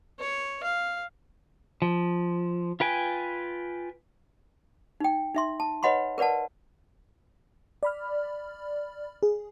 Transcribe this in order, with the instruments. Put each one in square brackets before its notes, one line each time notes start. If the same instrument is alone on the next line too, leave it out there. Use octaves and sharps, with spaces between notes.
[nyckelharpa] C#5
F5
[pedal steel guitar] F3
F4 B4 G5 G#5
[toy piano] D#4 G5
D#4 E5 C6
A5
B4 C#5 D#5 F#5 B5 C6
A#4 B4 D5 F#5 A5
[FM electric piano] D5 B5 F6
G#4